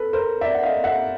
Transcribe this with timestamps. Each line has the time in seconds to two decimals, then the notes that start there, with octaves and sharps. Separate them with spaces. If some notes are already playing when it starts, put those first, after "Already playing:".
Already playing: A4 B4
0.13 A#4 C5
0.41 D5 E5
0.55 F#5
0.63 D#5 F5
0.84 E5 F#5